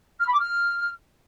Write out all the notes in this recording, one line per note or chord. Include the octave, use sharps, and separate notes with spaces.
F6
B5
D6
F6